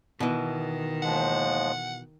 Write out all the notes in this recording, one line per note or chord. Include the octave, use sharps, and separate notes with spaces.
B2 D#3 E3
D#2 F3 G#3 F#5